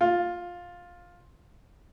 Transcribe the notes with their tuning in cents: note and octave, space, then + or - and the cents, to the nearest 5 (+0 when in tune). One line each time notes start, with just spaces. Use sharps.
F4 +10